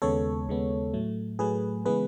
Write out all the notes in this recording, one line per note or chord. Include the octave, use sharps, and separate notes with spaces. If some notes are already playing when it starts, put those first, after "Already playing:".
D#2 C#3 G#3 B3 A4 C#5
D#2 C#3 G#3 B3
A2 F#3 A3
A2 F#3 A3 G#4 B4
C#3 E3 G#3 B3 G#4 B4